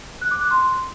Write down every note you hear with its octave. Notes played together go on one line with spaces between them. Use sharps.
F#6
D6
F#6
C6